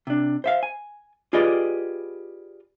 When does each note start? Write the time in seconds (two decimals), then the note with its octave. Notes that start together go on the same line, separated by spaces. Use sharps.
0.07 C3 D4
0.44 C5 E5 F5
0.63 G#5
1.33 F4 G4 G#4 B4 D5 D#5